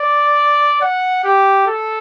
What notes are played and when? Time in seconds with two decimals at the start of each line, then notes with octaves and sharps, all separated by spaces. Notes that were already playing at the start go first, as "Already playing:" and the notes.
Already playing: D5
0.82 F#5
1.24 G4
1.66 A4